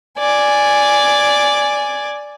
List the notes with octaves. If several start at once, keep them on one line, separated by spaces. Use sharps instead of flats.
D5 G#5